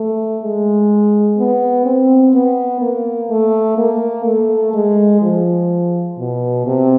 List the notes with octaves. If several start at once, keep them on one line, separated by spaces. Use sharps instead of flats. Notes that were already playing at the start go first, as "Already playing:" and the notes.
Already playing: A3
G#3
B3
C4
B3
A#3
A3
A#3
A3
G#3
F3
B2
C3